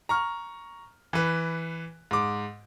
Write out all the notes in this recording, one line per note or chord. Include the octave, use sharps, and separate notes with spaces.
A#5 C#6 F6
E3 B4
G#2 D6